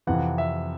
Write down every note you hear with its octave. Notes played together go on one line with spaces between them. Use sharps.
F2 C3 E3 F#5
E5